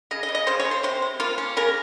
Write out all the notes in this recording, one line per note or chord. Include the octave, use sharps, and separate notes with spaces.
C#3 D#5
D#5
C#3
D#5
C#3 C5
C#5
C#3
C5
C3 C5
C3
A#3 F4
C#4
C#3 A#4